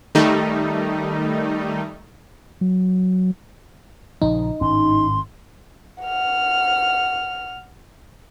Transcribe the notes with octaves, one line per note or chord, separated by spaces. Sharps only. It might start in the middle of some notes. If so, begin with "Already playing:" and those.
D#3 G3 A3 D#4
F#3
A#1 C#3 F3 D#4
G#1 A2 C#4 C6
F#5 F6